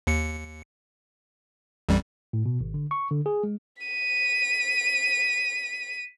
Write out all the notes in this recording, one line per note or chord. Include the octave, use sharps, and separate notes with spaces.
D#2 C#7
A1 F2 G3
A2
B2
G#1
D3
C#6
D3
G#4
G#3
B6 D#7